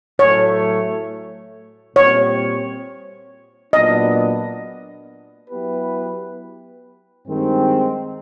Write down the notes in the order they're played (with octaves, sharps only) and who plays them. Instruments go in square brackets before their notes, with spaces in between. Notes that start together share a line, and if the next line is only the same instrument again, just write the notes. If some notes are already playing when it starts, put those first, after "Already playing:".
[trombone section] A2 F#3 A3 [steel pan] C#5
[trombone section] A#2 G3 C4 [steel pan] C#5
[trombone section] A#2 F#3 B3 D4 [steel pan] D#5
[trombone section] F#3 B3 E4 G4 B4
G2 D#3 G#3 C4